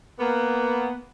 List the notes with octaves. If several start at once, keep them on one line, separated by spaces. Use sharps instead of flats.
A#3 B3